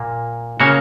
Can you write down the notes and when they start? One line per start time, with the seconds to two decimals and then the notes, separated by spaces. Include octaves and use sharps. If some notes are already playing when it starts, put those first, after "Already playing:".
Already playing: A#2 A#3
0.60 C#3 A#3 F#4 C#5